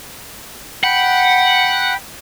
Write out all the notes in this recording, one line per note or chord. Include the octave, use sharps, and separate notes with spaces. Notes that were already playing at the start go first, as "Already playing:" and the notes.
F#5 G5 B5